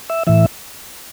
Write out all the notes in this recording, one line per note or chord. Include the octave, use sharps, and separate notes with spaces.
E5
A2 E3 E5